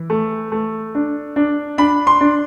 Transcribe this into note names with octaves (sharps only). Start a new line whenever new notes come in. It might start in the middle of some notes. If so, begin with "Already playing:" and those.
Already playing: E3
A3
A3
D4
D4
D4 B5
C6
D4